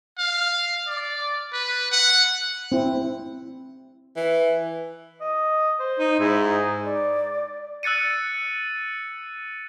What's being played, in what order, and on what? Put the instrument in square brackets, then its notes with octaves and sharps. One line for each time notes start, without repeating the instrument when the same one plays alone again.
[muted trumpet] F5
D5
B4
F#5
[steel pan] C4 E4
[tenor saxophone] E3
[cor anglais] D#5
C5
[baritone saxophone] D#4
[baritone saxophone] G#2 [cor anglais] E4
[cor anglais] D#4
[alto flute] D5
[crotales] E6 F#6 A6 C#7 D#7